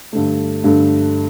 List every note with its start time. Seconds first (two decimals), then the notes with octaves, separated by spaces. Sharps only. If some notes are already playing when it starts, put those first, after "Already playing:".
0.13 G2 D3 A3
0.64 G2 D3 A3